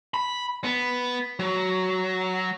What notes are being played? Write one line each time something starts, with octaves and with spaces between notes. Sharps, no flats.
B5
B3
F#3